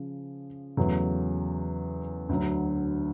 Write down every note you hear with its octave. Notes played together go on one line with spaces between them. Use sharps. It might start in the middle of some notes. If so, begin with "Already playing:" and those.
Already playing: C#3 F3
E2 C#3 F#3 A3
D2 D3 F#3